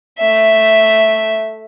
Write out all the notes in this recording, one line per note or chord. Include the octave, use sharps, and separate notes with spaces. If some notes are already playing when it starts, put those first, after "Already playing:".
A3 E5